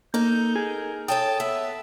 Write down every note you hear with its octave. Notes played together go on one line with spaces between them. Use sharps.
A#3 D#4 A4 G6
G#4 A#4
A4 C#5 G5 A5 D#6
B3 E5